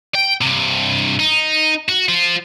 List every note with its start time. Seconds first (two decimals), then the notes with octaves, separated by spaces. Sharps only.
0.15 G5
0.41 G2 C3
1.20 D#4
1.89 F#4
2.09 F4 C5